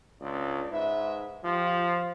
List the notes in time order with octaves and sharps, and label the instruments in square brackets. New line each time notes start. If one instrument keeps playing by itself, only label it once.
[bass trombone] C#2 [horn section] D4 D5
[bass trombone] G#2 [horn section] B4 E5
[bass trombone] F3 [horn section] F4 G4